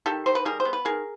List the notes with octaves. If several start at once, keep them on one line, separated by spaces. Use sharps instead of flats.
D#3 G4 A4
D#3 C5
B4
G3 G#4 A#4
C5
B3
B4
D#3 G#4 A#4